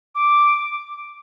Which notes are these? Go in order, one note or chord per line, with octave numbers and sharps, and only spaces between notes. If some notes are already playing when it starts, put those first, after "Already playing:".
D6